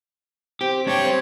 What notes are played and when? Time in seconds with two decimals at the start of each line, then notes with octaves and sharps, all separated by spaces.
0.61 C4 G4
0.87 D4 G4 C5 C#5
1.05 C4 C6